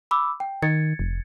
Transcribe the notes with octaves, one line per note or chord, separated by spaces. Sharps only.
B5 D6 E6
G5
D#3 G#6 A6 C#7
F1